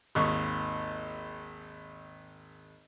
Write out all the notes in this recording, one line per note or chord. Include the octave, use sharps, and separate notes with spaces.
G#1 D#2 C#6